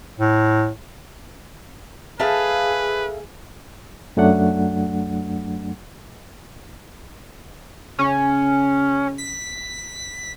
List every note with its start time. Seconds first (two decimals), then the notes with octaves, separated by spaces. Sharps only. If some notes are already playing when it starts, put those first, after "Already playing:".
0.18 A2
2.20 G#4 A4 B4 E5 F5
4.17 F#2 F#3 A3 D4 F#5
7.99 C#3 C#4
9.18 B6